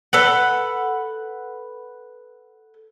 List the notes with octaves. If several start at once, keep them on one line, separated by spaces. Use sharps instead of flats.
A4 B4 F#5